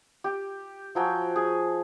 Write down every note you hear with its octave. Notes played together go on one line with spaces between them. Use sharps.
G4
F3 F#3 G5 G#5
G#4